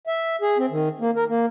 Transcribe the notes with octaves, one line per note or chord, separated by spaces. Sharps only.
E5
G#4
C4
D#3
A#3
A#4
A#3